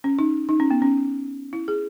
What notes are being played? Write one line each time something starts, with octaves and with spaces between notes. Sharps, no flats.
C#4
D#4
D#4
C#4
B3
C#4
E4
G#4